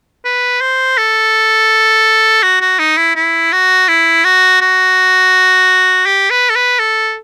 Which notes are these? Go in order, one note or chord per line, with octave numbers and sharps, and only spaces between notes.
B4
C5
A4
F#4
F#4
D#4
E4
E4
F#4
E4
F#4
F#4
G4
B4
A4
B4
A4